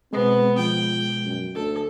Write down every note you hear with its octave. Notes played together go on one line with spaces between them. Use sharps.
B2 G#3 B3 C4
F3 G5
F#2
D2 A4